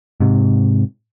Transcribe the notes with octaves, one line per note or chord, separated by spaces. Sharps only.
G#2 C3